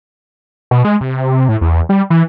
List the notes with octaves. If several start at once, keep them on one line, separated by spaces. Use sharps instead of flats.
B2
G#3
C3
A2
E2
G3
E3